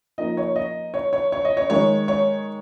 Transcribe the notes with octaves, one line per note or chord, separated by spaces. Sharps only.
A#2 F3 A#3 D#4 D#5
C#5
D#5
C#5
C#5
C#5
D#5
C#5
D#3 G#3 D#4 C#5
C#5